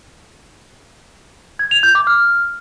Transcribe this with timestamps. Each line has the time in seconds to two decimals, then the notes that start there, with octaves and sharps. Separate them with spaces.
1.59 G#6
1.71 F7
1.83 G6
1.95 D6
2.07 F6